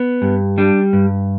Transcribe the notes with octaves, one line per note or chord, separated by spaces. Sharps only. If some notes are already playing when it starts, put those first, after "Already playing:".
Already playing: B3
G2
G3 D4
G2